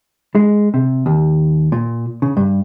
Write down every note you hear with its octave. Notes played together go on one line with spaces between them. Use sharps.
G#3
C3
D#2
A#2
C#3
G2